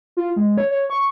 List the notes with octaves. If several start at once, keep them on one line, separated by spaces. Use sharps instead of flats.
F4
G#3
C#5
C#5
C#6